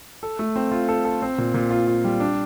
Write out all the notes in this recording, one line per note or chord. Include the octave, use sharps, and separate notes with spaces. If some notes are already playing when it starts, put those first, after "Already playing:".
A4
A3
C4
F4
A4
A4
C4
A#2
A#2
F4
F4
G3
D4